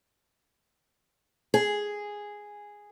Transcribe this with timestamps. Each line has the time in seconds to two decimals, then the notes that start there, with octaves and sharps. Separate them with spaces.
1.54 G#4